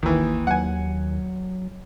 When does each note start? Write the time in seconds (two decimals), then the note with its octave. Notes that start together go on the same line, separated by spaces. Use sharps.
0.03 G#1 D#2 D#3 E3
0.47 F#3 F#5 G#5